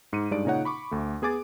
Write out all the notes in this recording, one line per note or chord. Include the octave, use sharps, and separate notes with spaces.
G#2 C#7 D#7
G2 G#3 D#4 D5 D7
A#2 C#3 D#4 C#5 F#5
B5 C#6 D6
D2 A3
B3 G#4 G#5 D6 A6